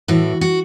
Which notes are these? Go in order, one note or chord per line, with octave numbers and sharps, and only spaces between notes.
A2 E3 F#4
F#4